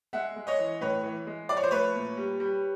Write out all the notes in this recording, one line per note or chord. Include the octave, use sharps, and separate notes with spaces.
G#3 E5 F#5
G#3
C#5 D#5
E3
A2 B4 C#5
E3
G#3
F3 D5
C#5
C5
A3 B4 C#5
A#2
G3
G3